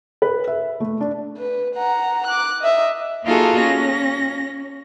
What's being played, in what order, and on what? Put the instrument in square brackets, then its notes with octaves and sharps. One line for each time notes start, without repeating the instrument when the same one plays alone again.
[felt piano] B4
E5
A3
D4
[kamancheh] B4
F#5 A#5
D6 F#6
D#5 E5
[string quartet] A#3 D#4 F4 F#4 G#4 A4
C#4 A#6